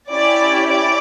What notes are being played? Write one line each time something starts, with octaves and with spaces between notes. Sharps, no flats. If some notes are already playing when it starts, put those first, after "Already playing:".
C#4 E4 G4 D5
D5